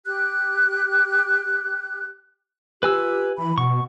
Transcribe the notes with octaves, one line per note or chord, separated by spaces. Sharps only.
G4 F#6
F4 G4 B4 G#5 E6
E3 B5
B2 F#5 C#6